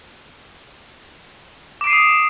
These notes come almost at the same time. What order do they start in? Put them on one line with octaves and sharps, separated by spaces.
D6 D7 C7 D#7 D#6